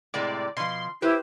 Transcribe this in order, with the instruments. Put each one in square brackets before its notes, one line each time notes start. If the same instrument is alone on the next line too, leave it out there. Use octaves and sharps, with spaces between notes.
[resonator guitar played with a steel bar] A2 C3 G#3 [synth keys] D5
[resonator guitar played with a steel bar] B2 F3 [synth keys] C6
[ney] E4 [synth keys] G4 [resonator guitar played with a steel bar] B4 C5